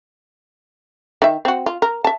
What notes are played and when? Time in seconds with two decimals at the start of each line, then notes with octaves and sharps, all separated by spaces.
1.22 D#3 E5
1.45 C4 F#4
1.66 F4
1.82 A#4
2.04 E5 A5